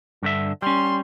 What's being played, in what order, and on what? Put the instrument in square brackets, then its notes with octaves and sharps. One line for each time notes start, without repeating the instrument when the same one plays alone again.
[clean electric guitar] G2 D3 E5
[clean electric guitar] G3 C#4 [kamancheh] C6